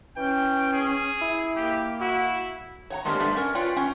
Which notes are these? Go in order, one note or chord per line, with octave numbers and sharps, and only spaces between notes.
E3 C#4 G5
G#4
E4
A#3 G4
E4 F#4
C#5 F#5 A#5
G#3 A#3 C4 D4 G4 A#4
A2 G3 A3 B3 D4 D5
C#4 A#4
F4 B4 C#5 D5 G5
C#4 G5